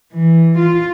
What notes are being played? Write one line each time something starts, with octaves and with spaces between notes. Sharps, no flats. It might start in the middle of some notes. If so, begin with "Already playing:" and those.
E3
F4